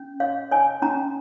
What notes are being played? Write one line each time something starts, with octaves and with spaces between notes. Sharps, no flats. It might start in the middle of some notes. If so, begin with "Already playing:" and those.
Already playing: C#4
C#5 F5
C#5 G#5
C#4 A#5